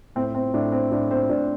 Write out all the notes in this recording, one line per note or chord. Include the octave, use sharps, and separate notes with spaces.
A2 C4
C4
A2 D4
C4
A2 D4
C4 C5
A2 D4 D5